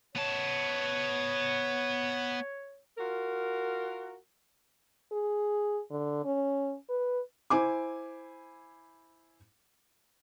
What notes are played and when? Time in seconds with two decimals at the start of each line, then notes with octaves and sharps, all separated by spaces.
0.15 B3 C#5 A5
2.98 F4 F#4 A#4
5.12 G#4
5.91 D3
6.24 C#4
6.89 B4
7.50 E4 C5 G#5 D6